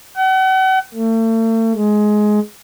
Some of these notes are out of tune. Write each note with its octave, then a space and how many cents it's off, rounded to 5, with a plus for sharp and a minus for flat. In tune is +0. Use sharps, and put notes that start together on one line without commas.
F#5 +40
A3 +40
G#3 +15